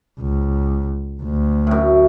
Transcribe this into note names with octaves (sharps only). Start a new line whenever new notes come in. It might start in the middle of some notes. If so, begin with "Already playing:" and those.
C#2
D2
F#2 A2